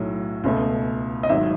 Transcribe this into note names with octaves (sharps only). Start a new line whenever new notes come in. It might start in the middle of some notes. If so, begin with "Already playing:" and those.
Already playing: B1 A2 F#3
C#2 B2 A3
D#5
G#1 G#2 F#3 E5